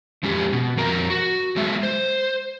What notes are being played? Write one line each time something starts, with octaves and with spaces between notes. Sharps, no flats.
F2 G#3 C#4 G4
B2
F2 A#4 A#5
F#4
F#3 G#3 E5
C5